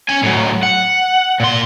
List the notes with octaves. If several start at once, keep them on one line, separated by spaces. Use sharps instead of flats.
C#4 G#5
A2 F#3
F#5
A#2 C6